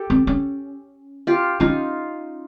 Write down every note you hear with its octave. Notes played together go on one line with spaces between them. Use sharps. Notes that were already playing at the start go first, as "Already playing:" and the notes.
Already playing: G4 A4
C4
C#4
F4 G4
C#4 D#4 F4